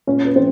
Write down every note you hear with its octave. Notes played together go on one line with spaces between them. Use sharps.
A#2 C#4 C#5
B4
F3 C4 C5